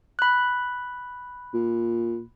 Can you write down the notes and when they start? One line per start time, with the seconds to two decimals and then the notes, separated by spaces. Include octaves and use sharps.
0.19 B5 F#6
1.54 A#2